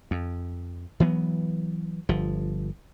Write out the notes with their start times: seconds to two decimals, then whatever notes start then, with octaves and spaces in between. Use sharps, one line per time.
0.11 F2
1.00 E3 F#3 B3
2.09 G1 F3